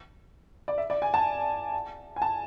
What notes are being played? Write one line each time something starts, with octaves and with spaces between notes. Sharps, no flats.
D5
E5
D5
G#5
A5
G#5
A5